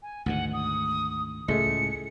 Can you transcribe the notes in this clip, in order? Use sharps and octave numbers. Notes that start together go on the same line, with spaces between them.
G#5
D2 G#2 D#3 F#5
D#6
C#2 A2 G#3 A3 C#7